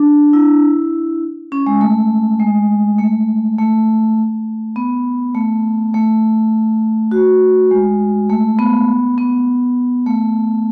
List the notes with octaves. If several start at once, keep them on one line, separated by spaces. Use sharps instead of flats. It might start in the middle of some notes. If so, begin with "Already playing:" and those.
Already playing: D4
E4
C#4
G#3
A3
G#3
A3
A3
B3
A3
A3
F#4
G#3
A3
B3
B3
A3